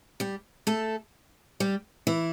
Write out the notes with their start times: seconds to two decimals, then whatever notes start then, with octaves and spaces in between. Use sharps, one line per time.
0.20 G3 G4
0.67 A3 A4
1.60 G3 G4
2.07 E3 E4